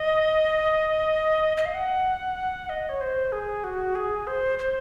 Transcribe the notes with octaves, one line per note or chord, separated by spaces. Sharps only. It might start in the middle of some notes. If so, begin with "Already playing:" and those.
Already playing: D#5
D#5
F5
F#5
D#5
C#5
C5
G#4
F#4
G#4
C5
C5